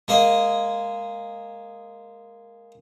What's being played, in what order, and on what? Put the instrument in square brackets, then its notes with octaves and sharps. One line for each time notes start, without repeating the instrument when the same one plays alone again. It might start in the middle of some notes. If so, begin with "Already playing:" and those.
[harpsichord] G#3 A#3 D#5